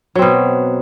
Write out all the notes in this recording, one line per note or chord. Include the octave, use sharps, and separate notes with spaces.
B2 F#3 C4